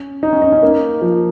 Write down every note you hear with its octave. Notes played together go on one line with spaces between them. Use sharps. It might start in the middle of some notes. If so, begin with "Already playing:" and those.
Already playing: C#4
D#4
C#4
D#4
C#4
A#3
F3